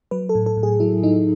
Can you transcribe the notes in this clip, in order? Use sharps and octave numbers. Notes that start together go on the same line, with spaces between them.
F#3 B4
A4
A2
A4
A2
G#4
F#3 E4
F#3 D#4